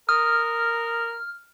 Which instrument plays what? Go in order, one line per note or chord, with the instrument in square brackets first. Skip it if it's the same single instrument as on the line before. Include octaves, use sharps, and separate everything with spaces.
[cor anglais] A#4 [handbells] D#6 [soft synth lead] F6